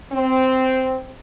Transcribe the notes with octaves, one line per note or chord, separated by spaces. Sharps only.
C4